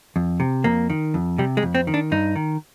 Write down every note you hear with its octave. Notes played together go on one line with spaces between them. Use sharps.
F2
C3
F2 A#3
D#3
F2
C3 G3
G#3
F2
C4
D#3
D4
G2 D#4
D#3